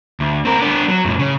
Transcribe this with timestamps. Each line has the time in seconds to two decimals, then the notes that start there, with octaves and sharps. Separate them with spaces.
0.20 D2
0.45 C4 A#4
0.59 B3 D4
0.88 F#3
1.05 F2 A2
1.19 C#3